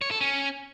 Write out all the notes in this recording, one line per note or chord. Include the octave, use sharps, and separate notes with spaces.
C#5
A4
C#4